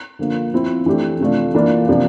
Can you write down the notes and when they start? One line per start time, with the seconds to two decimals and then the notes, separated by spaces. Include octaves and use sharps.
0.19 D3 F3 A#3
0.53 F3 C4 E4
0.86 E3 A3 D4 G4
1.20 C3 F3 A3 D4 F4
1.55 E3 A#3 D4 F4
1.88 C3 F3 A#3 D4 F4